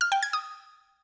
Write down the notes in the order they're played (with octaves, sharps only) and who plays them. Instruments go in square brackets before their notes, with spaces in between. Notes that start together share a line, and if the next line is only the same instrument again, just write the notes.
[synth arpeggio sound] F6
G5
G#6
D#6